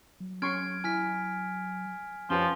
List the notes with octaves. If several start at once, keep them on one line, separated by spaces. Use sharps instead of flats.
F#3
C#4 C6 C#6 F6 G#6 D7
E4 G#5 F6 B6
F2 F3 C#4 G4 B4 G7